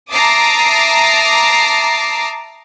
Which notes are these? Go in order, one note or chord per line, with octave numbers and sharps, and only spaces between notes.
E5 A5 A#5 D6 D#6 C7